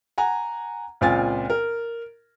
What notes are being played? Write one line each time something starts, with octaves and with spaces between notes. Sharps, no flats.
F#5 G#5 A#5
C#2 A#2 C4 F4 G#5 A6
A#4